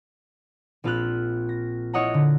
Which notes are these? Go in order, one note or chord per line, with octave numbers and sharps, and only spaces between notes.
A#1 C4 F4 B5 F6 F#6
A#6
E4 F4 C#5 D#5 F#5 A#5
D3